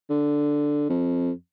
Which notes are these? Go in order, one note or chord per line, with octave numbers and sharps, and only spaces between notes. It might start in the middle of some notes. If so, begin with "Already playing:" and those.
D3
F2